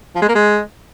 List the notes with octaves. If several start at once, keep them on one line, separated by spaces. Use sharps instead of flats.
F3
G#3
A#3
G#3